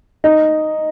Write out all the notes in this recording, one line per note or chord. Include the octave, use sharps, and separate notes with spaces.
D#4